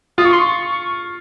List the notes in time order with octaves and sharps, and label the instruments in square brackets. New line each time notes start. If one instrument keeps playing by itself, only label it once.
[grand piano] F4 [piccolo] D#6
[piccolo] C#6
C6
C#6